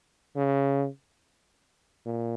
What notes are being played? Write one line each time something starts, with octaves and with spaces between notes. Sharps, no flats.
C#3
A#2